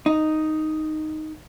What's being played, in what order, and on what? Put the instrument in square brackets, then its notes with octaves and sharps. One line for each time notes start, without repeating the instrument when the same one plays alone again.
[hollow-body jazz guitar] D#4